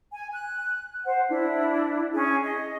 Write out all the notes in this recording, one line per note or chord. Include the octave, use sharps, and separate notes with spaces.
G#5
F#6
C5 F#5
D4 E4
C#4 G#4
D#5